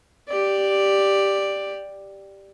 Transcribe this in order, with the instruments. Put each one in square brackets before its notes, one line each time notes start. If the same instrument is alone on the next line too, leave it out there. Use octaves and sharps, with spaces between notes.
[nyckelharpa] G4 D5